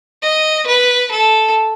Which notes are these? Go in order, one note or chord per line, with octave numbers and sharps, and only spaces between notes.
D#5
B4
A4